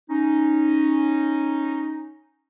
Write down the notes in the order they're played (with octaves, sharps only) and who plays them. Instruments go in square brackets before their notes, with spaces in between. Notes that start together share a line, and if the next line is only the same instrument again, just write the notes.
[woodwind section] C#4 D#4